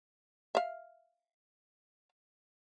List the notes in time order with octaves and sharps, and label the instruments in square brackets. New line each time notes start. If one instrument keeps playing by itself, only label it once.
[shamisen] E5 F5